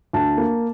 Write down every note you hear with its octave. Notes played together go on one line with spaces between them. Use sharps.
D2 A5
A#3